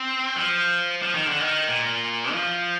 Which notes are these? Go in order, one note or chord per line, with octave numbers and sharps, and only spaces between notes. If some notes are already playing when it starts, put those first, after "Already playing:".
Already playing: C4
F3
F3
D#3
D3
D#3
A#2
F3